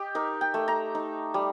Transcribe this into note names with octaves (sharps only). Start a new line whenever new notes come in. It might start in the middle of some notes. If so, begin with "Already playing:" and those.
Already playing: G4 D#5
D#4 A#4
G5
A3
A#5
D#4
G3